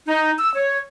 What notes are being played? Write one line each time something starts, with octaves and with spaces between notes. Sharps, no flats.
D#4
E6
C#5